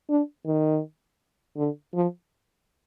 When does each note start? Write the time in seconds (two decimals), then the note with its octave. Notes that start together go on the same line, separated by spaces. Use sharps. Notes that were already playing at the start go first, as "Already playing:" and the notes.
0.09 D4
0.46 D#3
1.57 D3
1.94 F3